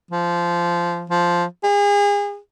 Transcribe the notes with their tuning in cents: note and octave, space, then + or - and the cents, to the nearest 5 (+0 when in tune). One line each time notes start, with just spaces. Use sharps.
F3 -15
F3 +0
G#4 -35